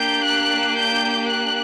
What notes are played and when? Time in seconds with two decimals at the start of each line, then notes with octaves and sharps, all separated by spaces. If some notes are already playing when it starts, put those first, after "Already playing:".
Already playing: A#3 D4 G4 G6
0.25 F#6
0.75 G6
1.27 F#6